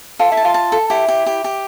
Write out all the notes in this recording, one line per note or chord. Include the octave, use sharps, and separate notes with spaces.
F4 A4
E4
A5
F4
A5
A4
E4 G4
G4
G4
G4